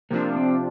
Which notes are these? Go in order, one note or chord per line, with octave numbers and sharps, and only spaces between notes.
C3 F3 A#3 D4
C4